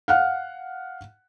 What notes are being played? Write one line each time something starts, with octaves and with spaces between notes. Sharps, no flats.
F5 F#5 F6